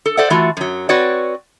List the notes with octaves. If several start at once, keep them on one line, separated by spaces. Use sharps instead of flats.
A4
A4 C5 D5 E5 F#5
E3 A3 F4 F#4
F#2 F#3
C4 F#4 B4 C#5 D5 F#5